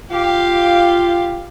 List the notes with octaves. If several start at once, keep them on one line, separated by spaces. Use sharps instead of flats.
F4 G4 F5